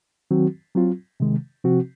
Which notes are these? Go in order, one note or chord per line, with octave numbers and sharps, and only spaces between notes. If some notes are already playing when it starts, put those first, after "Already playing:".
D#3 F#3 C4 F#4
F#3 C4 F4
C3 D#3 G#3
C3 F3 C4 F#4